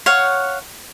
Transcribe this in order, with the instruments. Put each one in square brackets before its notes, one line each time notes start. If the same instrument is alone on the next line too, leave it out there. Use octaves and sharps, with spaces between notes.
[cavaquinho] C#5 F5 F#5